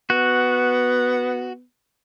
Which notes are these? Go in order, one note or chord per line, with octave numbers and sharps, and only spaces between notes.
B3 F#4